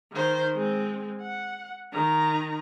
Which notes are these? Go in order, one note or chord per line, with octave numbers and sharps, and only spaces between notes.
D#3 C5
G#3 C4
F#5
D#3 A#5